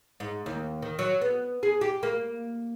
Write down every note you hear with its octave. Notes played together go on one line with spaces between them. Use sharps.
G#2
D#2
D#3
F#3
B3
G#4
G4
A#3